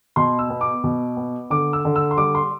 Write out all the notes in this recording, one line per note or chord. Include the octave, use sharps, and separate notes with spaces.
B2 C6
E6
B3
D6
B2
B3
D3 D6
E6
D3
E6
C6
G3 D6
C6